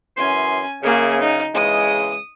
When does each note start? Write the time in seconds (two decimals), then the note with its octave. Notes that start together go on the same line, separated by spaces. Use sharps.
0.17 F#2 E3 C#4 G#5 C6
0.83 F#2 C#3 A#3 G#4
1.21 D#4
1.55 C#3 E3 G#3 D#6